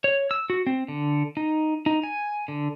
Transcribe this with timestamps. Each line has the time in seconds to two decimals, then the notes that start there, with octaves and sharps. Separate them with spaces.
0.04 C#5
0.31 E6
0.50 F#4
0.67 C4
0.88 D3
1.37 D#4
1.86 D#4
2.03 G#5
2.48 D3